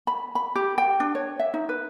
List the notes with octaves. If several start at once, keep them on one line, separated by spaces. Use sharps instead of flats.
B5
B5
G4
G5
D4
C#5
E5
D#4
B4